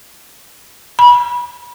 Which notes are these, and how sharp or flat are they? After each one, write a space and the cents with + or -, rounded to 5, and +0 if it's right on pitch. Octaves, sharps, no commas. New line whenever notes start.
B5 -25